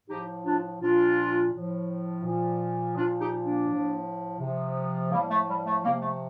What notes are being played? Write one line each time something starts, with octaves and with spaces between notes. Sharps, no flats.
A2 F3 D#4 G4
D4 F4
A#2 F3 D4 F4
A2 F3
A#2 F3
A#2 F3 D4 F4
D#4 G4
A#3 D4
A2 F3
C3 F3
A2 F3 G3 A#3
A3
G3
A3
C3 F3 G3 A#3
A3